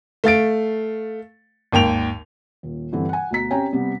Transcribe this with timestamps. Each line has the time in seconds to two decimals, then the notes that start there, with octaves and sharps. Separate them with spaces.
0.24 A3 F5 A6 D7
1.72 G#1 D#2 G5 F7
2.63 D#1
2.92 G2 D3 E3 C4
3.09 F#5 G#5
3.31 D2 B2 A#5 B6
3.50 C4 C#4 G4 G5 G#5 A#5
3.73 C3 G3 B3